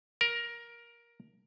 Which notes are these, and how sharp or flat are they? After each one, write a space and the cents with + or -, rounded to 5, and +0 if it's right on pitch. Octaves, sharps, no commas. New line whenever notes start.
A#4 +15